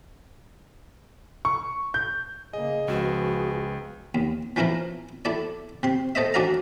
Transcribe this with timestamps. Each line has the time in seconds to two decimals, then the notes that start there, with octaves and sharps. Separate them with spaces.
1.45 C#6
1.94 G6
2.53 C#3 A#3 G#4 D#5
2.88 C#2 F3 B3 F#4
4.15 D#2
4.56 E3 F3 C#4 E4 A#4
5.25 E4 A4 D5
5.83 C3 C6
6.15 A4 C5 D#5 E5
6.34 C#4 D4 F#4 D5 F5 A#5